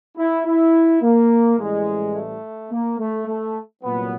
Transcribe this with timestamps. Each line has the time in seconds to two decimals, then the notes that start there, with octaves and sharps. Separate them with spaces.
0.17 E4
0.45 E4
1.02 A#3
1.58 A1 A2 E3 G3 G#3
2.15 A3
2.71 A#3
2.99 A3
3.27 A3
3.83 C2 A#2 F#3 B3